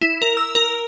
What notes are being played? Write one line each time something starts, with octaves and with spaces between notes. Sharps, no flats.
E4
A#4
E6
A#4